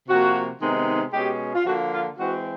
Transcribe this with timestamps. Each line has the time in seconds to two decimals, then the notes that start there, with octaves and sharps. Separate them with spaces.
0.08 C3 F3 A#3 F#4
0.61 C3 D#3 G#3 B3 D#4
1.13 B2 G#3 C#4 G4
1.55 F4
1.66 D3 F3 A#3 F#4
1.93 F4
2.19 E3 G#3 C4 F#4